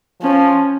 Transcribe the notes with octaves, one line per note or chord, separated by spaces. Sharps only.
F3 C#4